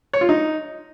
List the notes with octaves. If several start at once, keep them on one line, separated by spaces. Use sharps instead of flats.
C#5
F4
D#4